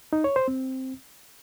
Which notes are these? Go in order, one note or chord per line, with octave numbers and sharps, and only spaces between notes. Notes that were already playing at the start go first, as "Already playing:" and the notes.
D#4
C#5
C5
C4